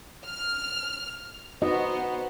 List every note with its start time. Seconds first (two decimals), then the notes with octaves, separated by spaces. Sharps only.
0.25 F6
1.62 B3 D#4 F#4 C5 D#5